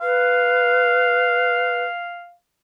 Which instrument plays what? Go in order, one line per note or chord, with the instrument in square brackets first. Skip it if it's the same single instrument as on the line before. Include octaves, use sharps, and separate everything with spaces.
[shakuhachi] B4 [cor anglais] F5